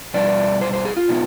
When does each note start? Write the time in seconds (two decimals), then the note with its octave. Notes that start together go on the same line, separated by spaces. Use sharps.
0.14 B2 G3 D4 D5
0.61 C5
0.73 C5
0.85 G#4
0.97 F4
1.09 B2 B3 D#4